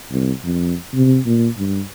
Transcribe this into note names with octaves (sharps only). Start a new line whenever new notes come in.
C2
F2
C3
A#2
G2